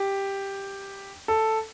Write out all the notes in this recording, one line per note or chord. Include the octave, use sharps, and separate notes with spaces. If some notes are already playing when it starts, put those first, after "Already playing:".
Already playing: G4
A4